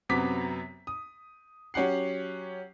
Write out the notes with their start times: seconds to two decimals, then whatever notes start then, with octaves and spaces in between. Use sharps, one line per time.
0.09 F#2 C3 F#3 B3 D6 B6
0.87 D#6
1.74 F#3 C#4 G4 F#5 C7